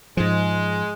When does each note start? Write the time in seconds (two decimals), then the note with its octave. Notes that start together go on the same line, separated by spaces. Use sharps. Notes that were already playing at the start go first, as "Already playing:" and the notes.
0.17 G#2 F3 G#3